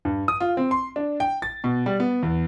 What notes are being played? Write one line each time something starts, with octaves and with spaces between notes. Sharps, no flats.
G2
D#6
F4
C4
C6
D4
G5
A6
B2
G3
B3
E2